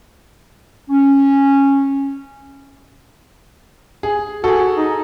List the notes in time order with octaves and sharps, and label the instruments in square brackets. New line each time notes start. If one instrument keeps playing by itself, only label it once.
[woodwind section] C#4
[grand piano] G#4
[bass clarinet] F#4 [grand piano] G#4 A4
[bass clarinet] D#4